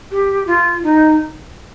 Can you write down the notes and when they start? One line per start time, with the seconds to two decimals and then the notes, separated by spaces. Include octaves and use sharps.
0.11 G4
0.47 F4
0.84 D#4